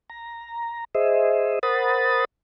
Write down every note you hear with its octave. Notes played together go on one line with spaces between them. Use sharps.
A#5
G#4 C5 D#5 E5
A#4 C5 F#5 B5 D#6 A6